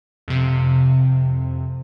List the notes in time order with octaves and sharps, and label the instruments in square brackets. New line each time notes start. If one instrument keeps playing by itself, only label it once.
[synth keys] F2 C3